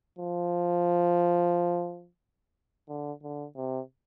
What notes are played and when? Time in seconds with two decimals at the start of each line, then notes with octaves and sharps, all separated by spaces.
0.19 F3
2.89 D3
3.23 D3
3.56 C3